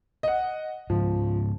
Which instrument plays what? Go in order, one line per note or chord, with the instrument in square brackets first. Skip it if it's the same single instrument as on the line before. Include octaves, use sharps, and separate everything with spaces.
[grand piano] D#5 F#5
[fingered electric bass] G#2 C#3 [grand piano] F3